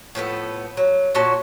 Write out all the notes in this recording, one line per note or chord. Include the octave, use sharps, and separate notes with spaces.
A2 F3 B3 A4
F#3
A#2 C#4 F#4 A5